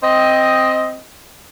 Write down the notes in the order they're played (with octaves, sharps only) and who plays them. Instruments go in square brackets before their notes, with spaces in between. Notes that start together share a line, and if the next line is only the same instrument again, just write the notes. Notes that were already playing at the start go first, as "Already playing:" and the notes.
[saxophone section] C4 D#5